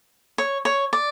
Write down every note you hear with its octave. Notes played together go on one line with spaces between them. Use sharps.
C#5
C#5
D5